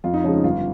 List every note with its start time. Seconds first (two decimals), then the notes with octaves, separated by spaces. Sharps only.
0.04 F2 F4
0.14 D#4
0.24 C#3 F3 G#3 C#4
0.34 D#4
0.44 G1 F4